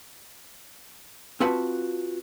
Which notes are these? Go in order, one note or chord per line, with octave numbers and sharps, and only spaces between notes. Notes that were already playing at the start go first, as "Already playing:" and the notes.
C4 F4 F#4 B4 A5